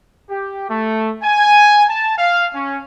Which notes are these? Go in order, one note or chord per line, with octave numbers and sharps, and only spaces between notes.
G4
A3
G#5
A5
F5
C#4